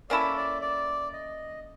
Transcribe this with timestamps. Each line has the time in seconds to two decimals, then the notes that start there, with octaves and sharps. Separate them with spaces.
0.10 A#3 C#4 E4 A4 D5
0.36 D5
0.62 D5
1.13 D#5